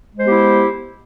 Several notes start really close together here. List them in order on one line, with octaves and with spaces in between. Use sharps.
G#3 C5 B3 G4 E4